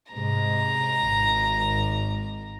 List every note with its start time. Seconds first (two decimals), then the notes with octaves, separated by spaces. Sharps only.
0.13 G#2 C3 G#3 A#5
1.00 G#1